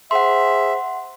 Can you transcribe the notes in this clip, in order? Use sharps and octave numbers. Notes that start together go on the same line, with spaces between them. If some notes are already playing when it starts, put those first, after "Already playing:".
G#4 C5 E5 F#5 C6